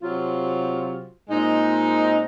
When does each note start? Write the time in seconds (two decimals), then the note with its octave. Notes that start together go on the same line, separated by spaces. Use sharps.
0.02 C3 F#3 C4 F4
1.28 A#2 G#3 C4 D#4